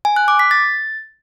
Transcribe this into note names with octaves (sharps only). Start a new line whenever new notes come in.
G#5
F#6
D6
B6
A6